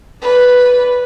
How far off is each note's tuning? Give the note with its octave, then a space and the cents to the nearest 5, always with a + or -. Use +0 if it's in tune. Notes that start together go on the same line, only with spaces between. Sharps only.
B4 +0 D5 -20